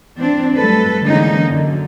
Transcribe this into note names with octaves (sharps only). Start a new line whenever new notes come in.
E3 C4 D4
F#3 G3 A3 A4 B4
D3 E3 G#3 A#3 C#4 D#4
F#2 D3